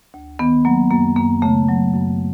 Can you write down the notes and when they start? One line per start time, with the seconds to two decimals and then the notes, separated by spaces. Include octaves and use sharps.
0.14 D2
0.39 D#3 B3
0.65 F#3 A#3
0.91 F#2 A#3
1.16 F#2 A#3
1.42 C#3 A3
1.68 F#3
1.93 F#2